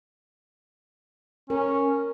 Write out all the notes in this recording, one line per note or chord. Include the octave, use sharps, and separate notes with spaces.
C#4 A#4